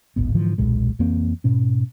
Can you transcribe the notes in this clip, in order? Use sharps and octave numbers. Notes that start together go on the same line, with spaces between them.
D1 G#1 B3
G#2 D3 E3 F3
D#1 B1 A#2 G#3
F2 E3 A#3 C4
G#2 B2 C#4